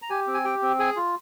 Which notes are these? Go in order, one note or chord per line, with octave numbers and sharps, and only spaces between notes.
A#5
G4 G#5
C4
G#5
G4 G5
C4
G#4 G#5
F4